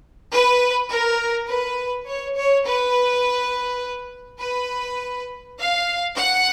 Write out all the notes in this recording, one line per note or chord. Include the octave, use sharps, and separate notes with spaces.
B4
A#4
B4
C#5
C#5
B4
B4
F5
F#5